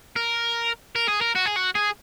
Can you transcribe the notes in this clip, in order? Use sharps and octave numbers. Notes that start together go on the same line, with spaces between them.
A#4
A#4
G#4
A#4
F#4
G#4
F#4
G#4